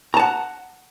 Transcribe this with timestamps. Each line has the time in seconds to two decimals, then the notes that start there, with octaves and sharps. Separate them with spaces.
0.14 A#5
0.17 A5
0.19 F#5